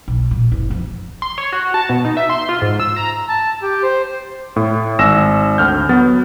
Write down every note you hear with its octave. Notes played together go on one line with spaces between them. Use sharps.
B1
A#2
F#1
F2
C6
C#5
F#4
A5
B2
D#4
E5
C6
F4
G#2
E6
A#5
A5
G4
C5
A2
G#1 E6 A#6 E7
D2 F6 G6
F#3 B3 A6